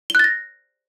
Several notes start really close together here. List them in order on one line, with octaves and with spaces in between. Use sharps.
G7 F#6 A6 A#6